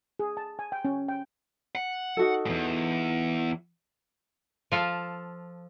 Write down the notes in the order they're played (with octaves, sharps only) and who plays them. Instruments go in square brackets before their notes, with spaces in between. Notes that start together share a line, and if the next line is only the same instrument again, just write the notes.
[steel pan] G#4
A5
G#5
G5
C#4
G5
[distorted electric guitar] F#5
[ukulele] D#4 F#4 A4
[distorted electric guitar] E2 G#2
[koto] F3 F4 A4